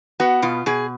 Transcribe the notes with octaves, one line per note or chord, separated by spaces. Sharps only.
B3 F#4
B2 F4
B2 G#4